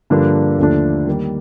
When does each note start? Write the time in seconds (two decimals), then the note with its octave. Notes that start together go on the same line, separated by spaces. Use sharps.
0.10 G2 D3 F3 A#3 D4
0.58 D#2 D3 F3 A3 D4
1.07 D#3 G3 A#3